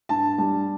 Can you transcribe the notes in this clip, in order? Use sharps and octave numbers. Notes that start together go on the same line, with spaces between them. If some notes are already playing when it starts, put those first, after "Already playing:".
G2 A5
G3 A5